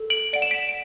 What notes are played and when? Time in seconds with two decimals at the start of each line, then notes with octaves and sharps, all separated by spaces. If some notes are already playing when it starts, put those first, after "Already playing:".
Already playing: A4
0.10 D7 F#7
0.33 D5 F#5 D7
0.42 E7
0.51 B6 D7
0.69 D7